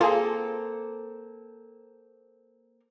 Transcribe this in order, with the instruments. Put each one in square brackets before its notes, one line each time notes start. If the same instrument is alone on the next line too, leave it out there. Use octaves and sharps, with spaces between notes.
[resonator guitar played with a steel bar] A#3 C4 A4 [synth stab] F4 G#4